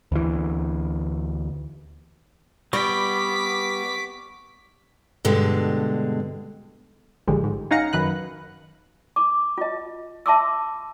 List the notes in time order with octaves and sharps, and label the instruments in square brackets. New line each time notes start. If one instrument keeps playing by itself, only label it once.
[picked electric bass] D2 E3
[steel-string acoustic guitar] G3 [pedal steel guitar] B3 [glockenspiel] C#6 [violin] D6 B6
[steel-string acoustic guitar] G2 B2 D3 G#3
[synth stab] A1 D3 F3 G3 G#3
G#2
C#4 D#4 F5 F#5 A#6 C#7
F#2 D#3 B4 F#6
[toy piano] D6
F4 D#5
E5 A5 C6 D6 E6